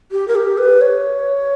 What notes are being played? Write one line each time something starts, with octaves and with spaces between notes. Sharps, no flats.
G4
A#4
G4
B4
C#5